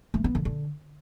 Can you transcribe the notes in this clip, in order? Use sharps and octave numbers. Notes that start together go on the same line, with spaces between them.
A3
B3
D3
D3